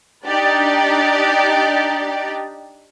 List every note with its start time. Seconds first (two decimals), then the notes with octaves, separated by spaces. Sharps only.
0.26 D4 D#4 G4 D5